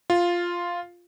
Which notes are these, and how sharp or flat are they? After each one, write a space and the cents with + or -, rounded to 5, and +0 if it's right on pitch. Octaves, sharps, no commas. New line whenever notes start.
F4 +0